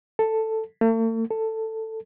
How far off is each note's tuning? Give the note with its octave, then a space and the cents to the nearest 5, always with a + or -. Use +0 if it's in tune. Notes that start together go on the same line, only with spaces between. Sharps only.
A4 +5
A3 +45
A4 +10